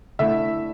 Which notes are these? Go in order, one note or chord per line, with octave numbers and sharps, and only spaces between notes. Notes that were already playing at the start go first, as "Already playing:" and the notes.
D3 A3 E4 E5